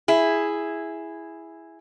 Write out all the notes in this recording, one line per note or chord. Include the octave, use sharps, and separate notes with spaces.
E4 G#4